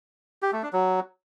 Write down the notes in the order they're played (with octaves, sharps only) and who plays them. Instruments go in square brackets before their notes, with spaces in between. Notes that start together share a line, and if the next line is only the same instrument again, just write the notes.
[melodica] G4
A3
D4
F#3